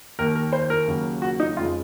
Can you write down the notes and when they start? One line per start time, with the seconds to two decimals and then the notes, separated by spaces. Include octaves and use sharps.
0.19 D#2 D#3 A#3 A#4
0.35 A#4
0.53 C5
0.70 A#4
0.88 D#2 C#3 F#3 A#3
1.22 F#4
1.40 D#4
1.57 F2 C#3 G#3 F4